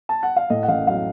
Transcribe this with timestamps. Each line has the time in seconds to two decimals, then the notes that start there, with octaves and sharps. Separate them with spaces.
0.09 A5
0.23 F#5
0.36 F5
0.50 A2 D#5
0.63 F#5
0.68 A1 F5
0.87 F#3 F5